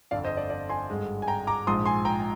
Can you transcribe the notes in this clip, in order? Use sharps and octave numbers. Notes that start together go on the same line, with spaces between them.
G1 F2 D3 D5 F5
C5 D#5
D5
D5
G#5 C6
G#1 G2 D3 G#3
G#5
G5 A#5
A#5 D6
A#1 G#2 F3 C6 D#6
G#5 C6
G5 A#5